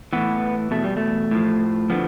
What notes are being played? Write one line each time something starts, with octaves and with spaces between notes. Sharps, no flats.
A2 E3 B3
E2 B2 A3
G3
A3
A2 F3
D3 F3 B3